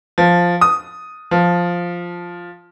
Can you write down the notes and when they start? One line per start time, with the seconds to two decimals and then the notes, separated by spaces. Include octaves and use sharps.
0.18 F3
0.61 D#6
1.31 F3